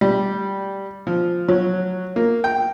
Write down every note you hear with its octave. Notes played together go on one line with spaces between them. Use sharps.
G3
F3
F#3
A#3
G5